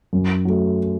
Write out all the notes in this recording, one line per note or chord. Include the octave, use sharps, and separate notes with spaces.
F#2
F#3 A3